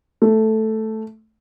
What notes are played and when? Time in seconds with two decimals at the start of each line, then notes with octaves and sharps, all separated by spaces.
0.22 A3